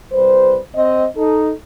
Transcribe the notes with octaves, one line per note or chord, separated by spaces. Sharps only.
C2 G3 B4 C5
C4 D#5
D#4 A4